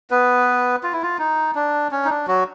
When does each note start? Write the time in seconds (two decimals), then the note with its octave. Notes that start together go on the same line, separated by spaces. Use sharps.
0.11 B3 B4
0.83 F4
0.93 E4
1.02 F4
1.19 D#4
1.55 D4
1.91 C#4
2.05 D#4
2.10 D4
2.27 F#3 F#4